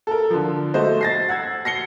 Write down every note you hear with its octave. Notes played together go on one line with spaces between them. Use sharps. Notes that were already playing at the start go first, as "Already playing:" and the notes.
A4 A#4
D3 F3
A3 F#4 C5 D#5
A6 A#6 C7
F#5 E6 G#6
A#6 C7 C#7 G7